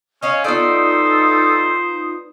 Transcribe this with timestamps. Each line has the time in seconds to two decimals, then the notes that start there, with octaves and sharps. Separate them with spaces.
0.22 C#4 D#5 F5
0.44 B3 D#4 F4 A4 C5 D5 D#6